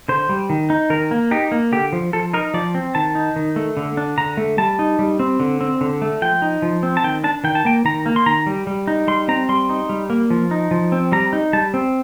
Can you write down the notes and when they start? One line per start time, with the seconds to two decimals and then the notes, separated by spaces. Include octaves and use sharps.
0.08 D3 C5
0.29 G3
0.50 D#3
0.70 D#4
0.90 D#3 A#4
1.11 A#3
1.31 D#4 G4
1.52 A#3
1.72 D3 G4
1.93 F3
2.13 F3 A4
2.33 D#4 A#4
2.54 F3 D5
2.75 C4
2.95 D#3 A5
3.15 D#4
3.36 D#3
3.56 A3
3.77 D3
3.97 D4
4.18 D3 A#5
4.37 A3
4.58 G3 A5
4.79 D#4
4.99 G3
5.20 C4
5.40 D3
5.61 C4
5.81 D3
6.02 A3
6.22 F3 G5
6.42 D#4
6.62 F3
6.83 C4
6.97 A5
7.04 D#3 G5
7.24 D4 A5
7.44 D#3 G5
7.55 A5
7.65 A#3 G5
7.85 D#3 A#5
8.06 A#3
8.16 C6
8.26 D#3 A#5
8.46 G3
8.67 G3
8.87 D#4
9.08 G3 C6
9.28 C4 A#5
9.49 G3 C6
9.69 D#4
9.90 G3
10.10 A#3
10.30 F3
10.51 D#4
10.71 F3
10.92 C4
11.12 G3 A#5
11.33 D#4
11.53 G3 A5
11.74 C4